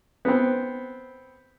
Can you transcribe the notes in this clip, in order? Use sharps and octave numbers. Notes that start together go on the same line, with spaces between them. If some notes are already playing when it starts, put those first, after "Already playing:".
B3 C4